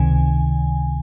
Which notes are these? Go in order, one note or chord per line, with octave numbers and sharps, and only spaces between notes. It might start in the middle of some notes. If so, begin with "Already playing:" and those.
Already playing: C#2 C3 D#3 G#5